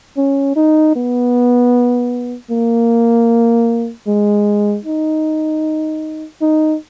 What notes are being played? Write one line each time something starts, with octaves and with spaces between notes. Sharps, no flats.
C#4
D#4
B3
A#3
G#3
D#4
D#4